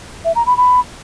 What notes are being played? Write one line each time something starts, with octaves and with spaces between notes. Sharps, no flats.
E5
A#5
B5
B5